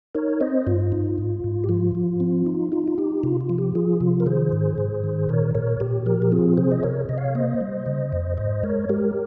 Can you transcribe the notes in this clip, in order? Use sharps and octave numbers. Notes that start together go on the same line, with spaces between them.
D#4 A#4 C#5
C4 C5 D#5
G2 F4
D#4
G#2
G#2
G4
F3 F4
F3
C4
D#4
D#4 F4
F4
D#4 G4
C3 F4
F4
F3
G4
F3 F4 G#4
C3 F4
A#4
D#3 G#4 C5
G#2
G#2
D#3
A#2 A#4 C#5
A#2 A#4 C#5
A#2 G4
F3 G4 A#4
G4
C4 F4 G#4
C3 G#4 C5
D#5
C3 A#4 C#5
C3 D#5
C#5 F5
A#3 C5 D#5
G3
C#3
F2
G#2 C5 D#5
G#3 A#4 C#5
G#3 G4 A#4